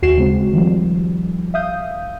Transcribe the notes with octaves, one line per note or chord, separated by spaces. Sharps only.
D#2 F#4 C7 E7
C#3 G#3 C4 F#4
D#3 F3 G3
E5 F5 D#6 G6